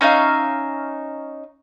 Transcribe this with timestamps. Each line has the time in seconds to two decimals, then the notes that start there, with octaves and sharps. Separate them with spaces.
0.01 C#4 D#4 E5 F5